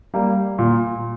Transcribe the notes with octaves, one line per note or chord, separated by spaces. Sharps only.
G3 A#3
A#2